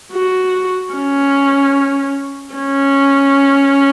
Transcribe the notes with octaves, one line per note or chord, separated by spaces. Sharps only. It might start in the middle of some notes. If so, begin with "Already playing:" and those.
F#4
C#4
C#4